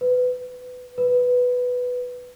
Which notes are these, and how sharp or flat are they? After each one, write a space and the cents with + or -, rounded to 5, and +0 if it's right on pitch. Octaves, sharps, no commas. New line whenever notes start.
B4 +20
B4 +5